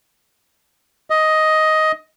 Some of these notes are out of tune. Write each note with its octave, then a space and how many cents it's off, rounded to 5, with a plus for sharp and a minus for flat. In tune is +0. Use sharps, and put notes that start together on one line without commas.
D#5 +10